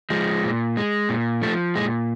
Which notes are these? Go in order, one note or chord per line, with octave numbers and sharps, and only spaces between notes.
F3 G#3
A#2
G#3
A#2
F3 A3
A#2 G#3